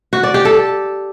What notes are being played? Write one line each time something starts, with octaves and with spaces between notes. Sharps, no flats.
F#4
D5
G4
A4